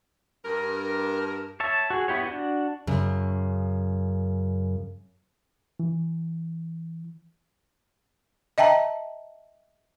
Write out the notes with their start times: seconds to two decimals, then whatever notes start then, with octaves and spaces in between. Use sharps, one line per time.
0.45 G2 A#4
1.60 C#5 E5 A5
1.90 F#4 G#4
2.08 B3 E4 G4 C#5
2.24 D4 F#4
2.87 F#2 C#3
5.80 E3
8.58 D#5 E5 G5 A5 A#5